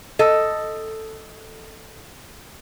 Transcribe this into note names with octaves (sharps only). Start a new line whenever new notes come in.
A4 D#5